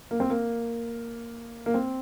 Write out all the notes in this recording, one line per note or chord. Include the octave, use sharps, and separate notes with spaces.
A#3
C4
A#3
A#3
C4